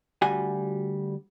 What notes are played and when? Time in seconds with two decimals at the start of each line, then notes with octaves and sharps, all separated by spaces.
0.22 D2 G3 F#4 G#5